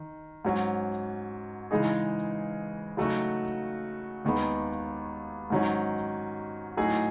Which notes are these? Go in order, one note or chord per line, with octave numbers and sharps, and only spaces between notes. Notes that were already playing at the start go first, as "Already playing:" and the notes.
Already playing: D#3
G#2 F#3 C#4
C#3 E3 G#3 D#4 G#4
C#3 F#3 A3 D#4 F#4
D#2 D#3 G#3 B3
G#2 D#3 F#3 C#4
A2 F#3 A3 D#4 G#4